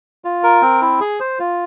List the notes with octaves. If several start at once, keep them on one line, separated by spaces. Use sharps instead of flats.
F4
A#4
C4
E4
G#4
C5
F4